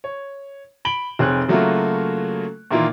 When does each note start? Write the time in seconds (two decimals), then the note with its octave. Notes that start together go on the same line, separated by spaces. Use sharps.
0.04 C#5
0.85 B5 D7 F#7 G7
1.19 F1 C4 G#4 C#5 F#6
1.48 C#3 F#3 A3 A#3 F4 F#4
2.71 A#2 D#3 E3 A#3 E4 F4